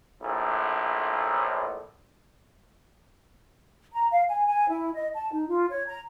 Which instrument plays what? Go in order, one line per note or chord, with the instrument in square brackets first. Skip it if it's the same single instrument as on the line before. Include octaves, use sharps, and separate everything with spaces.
[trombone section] A#1 A2
[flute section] A#5
F5
G#5
G#5
E4
D#5
A5
D#4
F4
C#5
A#5